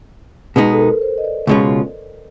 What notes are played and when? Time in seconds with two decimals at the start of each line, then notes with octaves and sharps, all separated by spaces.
0.56 B2 G#3 B3 D#4 B4
0.73 A4
0.79 A#4
1.01 C5
1.18 D#5
1.24 D5
1.47 C#2 B2 G#3 C#4 F4